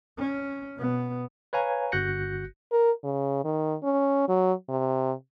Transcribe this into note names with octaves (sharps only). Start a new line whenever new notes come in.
C#4
B2 B3
B4 C#5 F5 G#5 A#5
G1 F#4 F#6 G6 A#6 C#7
A#4
C#3
D#3
C#4
F#3
C3